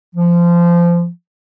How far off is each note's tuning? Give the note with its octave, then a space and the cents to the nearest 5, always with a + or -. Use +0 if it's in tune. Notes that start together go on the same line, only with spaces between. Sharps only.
F3 -20